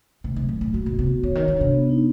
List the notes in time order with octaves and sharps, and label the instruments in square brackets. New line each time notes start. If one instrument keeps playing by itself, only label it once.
[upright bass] C3 [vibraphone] A3
[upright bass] C3
[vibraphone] F#3
[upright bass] A#2
[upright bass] A2 [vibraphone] A3
[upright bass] A#2 [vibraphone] F#4
[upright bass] B2
[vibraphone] B3
[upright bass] C3
[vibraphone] F#4
[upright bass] D3 [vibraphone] C#5
[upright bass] D#3
[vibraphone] C#5
[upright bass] D3
[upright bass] C3 [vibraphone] D4
[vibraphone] B3
D#4